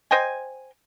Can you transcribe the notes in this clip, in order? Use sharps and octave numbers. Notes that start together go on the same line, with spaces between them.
C5 D#5 G5 G#5